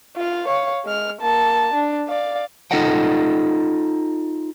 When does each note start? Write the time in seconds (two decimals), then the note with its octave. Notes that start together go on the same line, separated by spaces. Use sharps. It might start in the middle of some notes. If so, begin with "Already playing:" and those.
0.17 F4 F5
0.48 C#5 F5
0.85 G#3 F6
1.21 A#3 A5
1.74 D4
2.09 D5 F5
2.71 D#4 F4 A4 D#5 F#5 G5